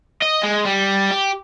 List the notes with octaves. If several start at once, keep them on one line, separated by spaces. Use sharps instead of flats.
D#5
G#3
G3
G4